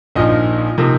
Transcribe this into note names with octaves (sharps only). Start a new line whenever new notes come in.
A#1 A#2 F3 D#4 D#5
C3 F3 A#3 D#4